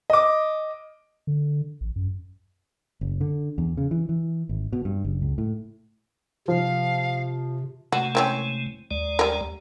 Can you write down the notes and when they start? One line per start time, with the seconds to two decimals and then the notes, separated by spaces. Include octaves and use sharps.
0.10 D#5 D6
1.27 D3
1.81 A1
1.96 F#2
3.01 F#1
3.21 D3
3.58 E2
3.77 C#3
3.91 E3
4.09 E3
4.49 G#1
4.73 B2
4.85 G2
5.05 F#1
5.22 C#2
5.38 A2
6.48 C3 F3 F5
7.92 C3 G#3 A3 F#4
8.15 E3 C4 C#4
8.91 D#2 G#3 D5
9.19 G3 A#4